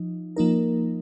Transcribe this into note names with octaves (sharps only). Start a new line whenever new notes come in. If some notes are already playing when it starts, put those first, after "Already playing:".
Already playing: F3 D#4
F3 A#3 D#4 A#4